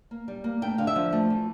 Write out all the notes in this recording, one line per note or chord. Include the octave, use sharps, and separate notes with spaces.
A#3
G3
A#3
A3 G5
D3 F5
E5
F3
A3
E3